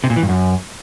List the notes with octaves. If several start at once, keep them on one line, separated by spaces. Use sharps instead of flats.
C3
A#2
E3
G2
F#2